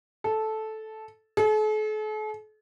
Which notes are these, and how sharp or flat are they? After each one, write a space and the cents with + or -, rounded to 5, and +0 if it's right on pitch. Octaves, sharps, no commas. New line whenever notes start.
A4 -10
A4 -45